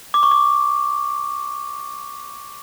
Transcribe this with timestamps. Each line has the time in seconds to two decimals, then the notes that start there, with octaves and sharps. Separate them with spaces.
0.14 D6
0.23 C#6
0.31 D6